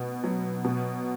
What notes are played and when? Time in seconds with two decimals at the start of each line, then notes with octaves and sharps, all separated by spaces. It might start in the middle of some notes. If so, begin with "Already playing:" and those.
Already playing: B2
0.24 F#3
0.64 B2